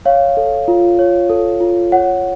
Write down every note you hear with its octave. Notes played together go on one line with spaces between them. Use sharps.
C#5 F5
A4
F4
C#5
A4
F4
C#5 F#5